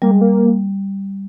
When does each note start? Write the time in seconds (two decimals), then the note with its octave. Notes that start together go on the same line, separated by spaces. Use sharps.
0.02 G3 A#3
0.11 G#3
0.21 A#3